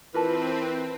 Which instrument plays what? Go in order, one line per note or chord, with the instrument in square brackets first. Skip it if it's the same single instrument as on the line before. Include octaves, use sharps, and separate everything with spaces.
[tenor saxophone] E3 [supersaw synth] C4 [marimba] F4 A#4 A5 [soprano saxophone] B4